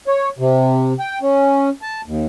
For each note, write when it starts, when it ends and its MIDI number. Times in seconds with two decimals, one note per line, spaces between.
0.07 0.29 73
0.38 0.93 48
0.99 1.19 79
1.21 1.69 61
1.82 2.01 81
2.06 2.27 39